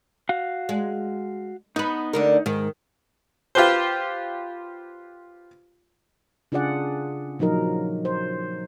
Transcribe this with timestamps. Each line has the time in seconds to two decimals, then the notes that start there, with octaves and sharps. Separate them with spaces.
0.29 F#4 F5
0.69 G#3
1.76 B3 D#4 B4
2.13 D2 D3 A#4
2.46 G#2 D#3
3.55 F4 G4 B4 C5
6.52 C#3 D4 F4 G#4 D5 F#5
7.39 A#2 F3 F#3 D#4 A#4
8.05 C5